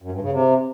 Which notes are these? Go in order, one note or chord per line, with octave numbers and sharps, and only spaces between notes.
F#2
G2
C#3
C3